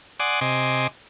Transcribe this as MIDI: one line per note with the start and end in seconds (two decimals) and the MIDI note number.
0.20 0.40 74
0.20 0.40 78
0.20 0.40 80
0.20 0.40 84
0.20 0.40 86
0.20 0.40 87
0.41 0.87 48
0.41 0.87 75
0.41 0.87 80
0.41 0.87 84
0.41 0.87 86